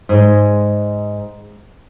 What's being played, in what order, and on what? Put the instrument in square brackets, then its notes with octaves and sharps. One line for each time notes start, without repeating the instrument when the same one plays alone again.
[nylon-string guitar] G#2 G#3